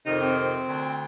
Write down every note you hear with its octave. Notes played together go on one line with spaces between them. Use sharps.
F2 C3 D#3 D#4
C4
D2 D3